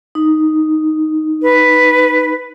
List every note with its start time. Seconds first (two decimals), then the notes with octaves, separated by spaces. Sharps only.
0.15 D#4
1.42 B4